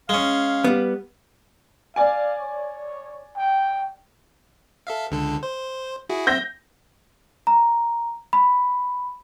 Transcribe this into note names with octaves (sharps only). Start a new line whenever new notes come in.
G#3 C#4 F5
G3 B3
D5 F5 G#5
C#5
G5
A4 E5 F5
C#2 D3 A4
C5
E4 F#4 G#4
C4 E5 G6 A#6
A#5
B5